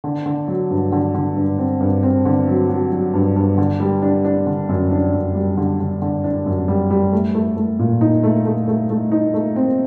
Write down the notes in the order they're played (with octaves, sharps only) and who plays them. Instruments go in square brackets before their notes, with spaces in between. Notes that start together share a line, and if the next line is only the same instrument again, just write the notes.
[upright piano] D3
D3
F#3
G2
D3
D3
G2
C4
G2
C4
D3
F#3
F#3
F#3
G2
G2
D3
G3
D4
D4
D3
F#2
D4
F#2
G3
D3
D3
D3
D4
F#2
G3
G3
A3
A3
A3
A#2
D#4
A3
A3
A3
A3
D#4
A3
C4